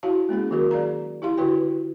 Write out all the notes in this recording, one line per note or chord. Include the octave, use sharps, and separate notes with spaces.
E4 F#4 C#5 F5 A5
G#3 A#3 C#4 G#4
D#3 F#3 F#4 G#4 A#4
G#4 D5 F5 A#5
E4 G4 F5 C6
D3 E4 F#4 B4 C#5 G5